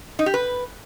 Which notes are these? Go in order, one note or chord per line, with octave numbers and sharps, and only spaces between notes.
D#4
G4
B4